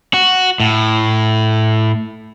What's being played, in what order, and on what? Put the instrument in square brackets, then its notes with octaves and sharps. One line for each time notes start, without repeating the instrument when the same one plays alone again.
[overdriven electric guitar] F#4
A2